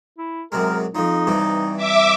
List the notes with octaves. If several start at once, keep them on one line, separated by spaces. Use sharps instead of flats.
E4
F#2 C3 G#3 A#4
F2 F3 D#4
G2 C3 E3
E5 D6